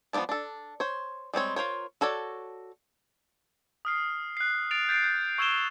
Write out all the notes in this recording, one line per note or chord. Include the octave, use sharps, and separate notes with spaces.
F3 G3 B3 D5 A5
D4 A4
C5 C#5
G3 G#3 C4 C#5
F4 A#4 C5 C#5
F#4 A4 C#5 D5
D#6 F6 C7
F#6 C7
A6 D7 F7
G6 A6 C7 D7
G6
C#6 E6 G#6 D7 E7 G7